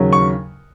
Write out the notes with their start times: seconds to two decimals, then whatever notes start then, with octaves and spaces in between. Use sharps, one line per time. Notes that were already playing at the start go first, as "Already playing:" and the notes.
Already playing: D#2 C#3 F#3
0.13 C#6